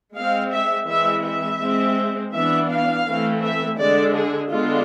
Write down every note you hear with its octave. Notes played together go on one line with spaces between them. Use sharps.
G#3 C4 F5
E5
E3 G#3 C4 E5
E5
G#3 C4
E3 B3 D4 E5
F5
E3 A3 C4
E5
D3 G#3 D4 D5
G#4
D3 G#3 B3 D4 F4